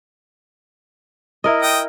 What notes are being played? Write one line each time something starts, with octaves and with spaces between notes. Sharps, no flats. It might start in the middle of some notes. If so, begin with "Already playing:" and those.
E4 A#4 D#5
G5 D#6